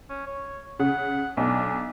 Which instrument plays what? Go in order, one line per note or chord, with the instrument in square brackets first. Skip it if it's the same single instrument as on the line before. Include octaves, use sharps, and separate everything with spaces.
[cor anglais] C#4
C#5
[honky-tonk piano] C#3 [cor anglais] F#5
[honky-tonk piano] B1 [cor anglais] D4